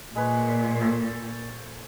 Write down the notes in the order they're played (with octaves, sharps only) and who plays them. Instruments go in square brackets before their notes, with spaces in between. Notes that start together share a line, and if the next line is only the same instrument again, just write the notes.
[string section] A#2 [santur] G#3 B4 C#5
[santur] A4 C5 C#5